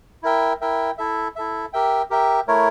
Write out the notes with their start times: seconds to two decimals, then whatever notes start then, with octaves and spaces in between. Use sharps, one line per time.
0.23 E4 A#4 E5 G5
0.61 E4 A#4 E5 G5
0.98 E4 A4 E5
1.36 E4 A4 E5
1.73 G4 A#4 E5 G5
2.10 G4 A#4 E5 G5
2.48 A3 E4 A#4 C#5